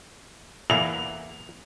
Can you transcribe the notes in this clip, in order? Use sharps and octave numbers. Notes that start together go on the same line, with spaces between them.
E2 E3 A#3 F7